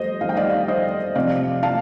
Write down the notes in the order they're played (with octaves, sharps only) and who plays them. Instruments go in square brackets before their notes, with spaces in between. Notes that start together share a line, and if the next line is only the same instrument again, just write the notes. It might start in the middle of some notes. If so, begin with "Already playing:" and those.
Already playing: [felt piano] F2 G3 G4 C5 D#5
F2 D#3 G3 F5
G5
D5 F5
C5 D#5
C3 F3 C4 D5 F5
F5 A5